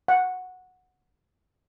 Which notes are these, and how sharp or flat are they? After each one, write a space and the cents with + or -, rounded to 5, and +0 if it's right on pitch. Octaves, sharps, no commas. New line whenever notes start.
F#5 -10